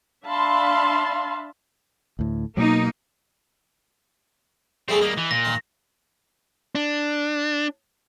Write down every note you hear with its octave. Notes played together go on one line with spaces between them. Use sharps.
D4 E5 F5 A5 B5 C6
D2 A2
B2 F#3 A#3 D#4
G3 A3 C4 E4 G#4
G3 A#3 D#5
E3
A#2 A#6
D#3 C6
D4